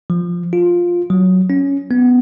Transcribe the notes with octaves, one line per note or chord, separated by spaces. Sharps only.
F3
F4
F#3
C#4
B3